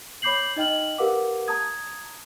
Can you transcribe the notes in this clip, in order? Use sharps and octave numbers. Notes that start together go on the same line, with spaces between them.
C#5 B5 D6 G6 C7 F#7
D#4 D#5 G5 F6 F#7
G4 A#4 B4 F5 F#5 D6
A5 A#5 D#6 G#6